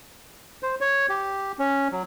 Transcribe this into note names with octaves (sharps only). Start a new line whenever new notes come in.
C5
C#5
G4
C#4
F#3